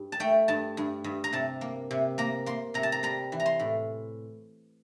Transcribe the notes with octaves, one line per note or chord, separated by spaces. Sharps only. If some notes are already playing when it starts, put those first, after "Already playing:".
Already playing: G2
A5
A3 G5
G2 A5
G2
G2
A#5
C3 A5
A#3
C3
A#3 A#5
A#3 C6
C3 A#5
A5
A#5
G3 A#5
E3
A#5
C6
A2